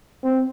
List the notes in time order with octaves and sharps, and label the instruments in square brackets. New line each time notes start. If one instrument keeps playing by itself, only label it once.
[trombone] C4